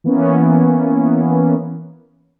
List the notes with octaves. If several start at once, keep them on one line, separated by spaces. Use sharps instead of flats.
E3 A#3 B3 C#4